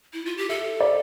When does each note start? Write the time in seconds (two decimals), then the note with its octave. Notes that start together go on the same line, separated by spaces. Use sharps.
0.13 E4
0.25 F4
0.37 G4
0.49 A4 E5
0.81 D5